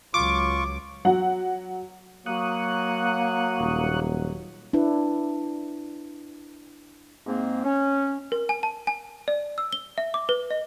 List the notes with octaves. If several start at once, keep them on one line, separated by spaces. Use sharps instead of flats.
C#2 F#3 F4 C#6 D6
F#3 F#5
F#3 A#3 C#6 D#6 F#6
D#1
D4 E4 B4
G#2 A#3 C4
C#4
A#4
G#5
A5
G#5
D5
E6
G7
E5
D6
B4
D#5